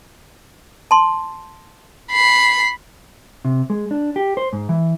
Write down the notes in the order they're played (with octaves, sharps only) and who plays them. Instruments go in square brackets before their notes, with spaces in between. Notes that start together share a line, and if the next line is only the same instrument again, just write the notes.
[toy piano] A5 C6
[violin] B5 C7
[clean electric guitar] C3
G#3
D4
G4
C5
G#2
E3